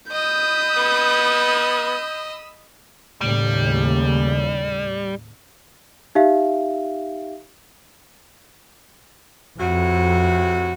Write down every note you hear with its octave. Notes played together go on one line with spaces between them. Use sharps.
D#5 B5 D#6 E6 G6
B3
D#2 A2 C#3 G3
D#4 G4 E5 F5
F2 A2 C3 F#4